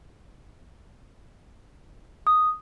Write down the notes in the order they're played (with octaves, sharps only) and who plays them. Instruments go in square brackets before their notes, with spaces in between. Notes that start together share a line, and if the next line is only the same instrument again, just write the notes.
[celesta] D#6